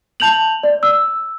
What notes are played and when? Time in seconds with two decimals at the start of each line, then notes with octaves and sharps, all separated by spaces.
0.20 A5 G6 F7 F#7
0.63 D5
0.83 E6